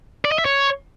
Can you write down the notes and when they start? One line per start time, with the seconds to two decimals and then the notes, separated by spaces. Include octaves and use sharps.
0.25 D5
0.32 D#5
0.38 E5
0.45 C#5